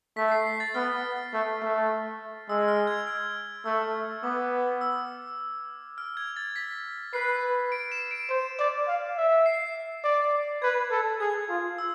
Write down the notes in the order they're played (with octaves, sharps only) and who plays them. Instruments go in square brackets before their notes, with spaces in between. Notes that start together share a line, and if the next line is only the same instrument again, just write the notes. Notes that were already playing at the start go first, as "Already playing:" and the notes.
[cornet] A3 [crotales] B6
[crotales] C7
C7
A6
[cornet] B3 [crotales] F6
[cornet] A3
A3
[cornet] G#3 [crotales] E6
[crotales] F6
G#6
F6
[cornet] A3 [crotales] E6
[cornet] B3 [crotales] D6
[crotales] E6
F6
G#6
A6
B6
[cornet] B4 [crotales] C7
[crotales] D7
E7
D7
[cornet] C5
D5
F5
E5
[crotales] C7
[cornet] D5
[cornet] B4 [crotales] G#6
[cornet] A4
[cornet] G#4 [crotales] G#6
[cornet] F4
[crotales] E6